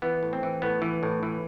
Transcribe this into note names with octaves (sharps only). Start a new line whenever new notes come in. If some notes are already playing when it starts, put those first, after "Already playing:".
E3 B3
A2
C4
E3
A2 B3
E3
A2
E3